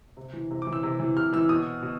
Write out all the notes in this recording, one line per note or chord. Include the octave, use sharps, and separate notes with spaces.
C3
E3
C3
D6
E3
E6
C3
E3
C3 F6
E3 E6
B2 D#6
B2